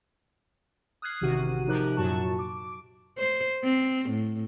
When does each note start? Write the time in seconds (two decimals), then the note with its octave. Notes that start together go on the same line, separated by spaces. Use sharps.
1.02 D#6 F6 F#6 G#6 C7
1.21 A1 C3 D#3 F#4 F#5 D#7
1.67 C3 F3 D#4 G4 A#4 F#6
1.97 F#2 A#2 F#3 F#4 A5 C#6
2.39 D6
3.18 C5
3.63 C4
4.10 A2